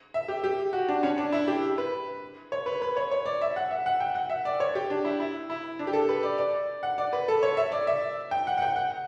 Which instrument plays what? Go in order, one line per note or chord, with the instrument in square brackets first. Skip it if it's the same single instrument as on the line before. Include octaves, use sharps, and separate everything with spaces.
[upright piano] E5
G4
G4
F#4
D4
C#4
D4
E4
G4
B4
C#5
B4
B4
C#5
C#5
D5
E5
F#5
E5
F#5
G5
F#5
E5
D5
C#5
G4
D4
E4
E4
E4
D4
G4
A4
B4
D5
D5
F#5
D5
B4
A4
C#5
E5
D5
E5
G5
F#5
F#5
G5
F#5